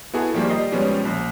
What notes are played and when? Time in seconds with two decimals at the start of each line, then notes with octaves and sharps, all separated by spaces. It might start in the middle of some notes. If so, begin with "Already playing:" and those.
0.14 B3 E4 F#4 G#4 A4
0.34 D#3 F3 G3 A#3 G#4
0.50 G3 D#5 C7
0.72 B2 F3 G3 G#3 B3 C#4
1.05 A#1